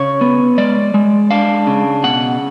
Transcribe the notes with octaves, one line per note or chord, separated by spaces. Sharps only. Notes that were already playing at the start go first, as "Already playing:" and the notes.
Already playing: C#3 C#5
B3
G#3 D5
G#3
D4 F5
C#3
B2 F#5